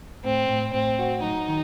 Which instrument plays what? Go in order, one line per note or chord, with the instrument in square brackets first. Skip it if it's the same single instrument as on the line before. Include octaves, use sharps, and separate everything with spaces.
[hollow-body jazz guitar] A2 [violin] C4
[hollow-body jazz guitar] A2
[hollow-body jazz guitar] A2 [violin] C4
[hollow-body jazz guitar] F#4
[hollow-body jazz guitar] F#3 [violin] D#4
[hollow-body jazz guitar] D#3